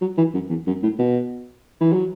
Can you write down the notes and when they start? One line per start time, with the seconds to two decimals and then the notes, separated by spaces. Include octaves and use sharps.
0.01 F#3
0.18 E3
0.34 F#2
0.50 E2
0.67 F#2
0.83 A2
0.99 B2
1.81 E3
1.93 F#3